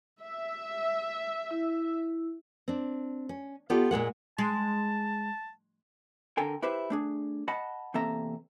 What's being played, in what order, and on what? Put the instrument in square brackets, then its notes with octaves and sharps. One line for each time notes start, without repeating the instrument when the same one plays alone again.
[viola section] E5
[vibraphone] E4
[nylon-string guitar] C4 D4
C#4
B3 F4 G4 A4 D5
A#2 D#3 G#3 F#5
[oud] G#3 [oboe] A5
[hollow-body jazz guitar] D3 A4 A#4 G5 G#5
E4 G4 B4 C5 E5
A3 D4 G#4
D#5 F#5 A5 B5
E2 C3 A#3 A4 E5 A#5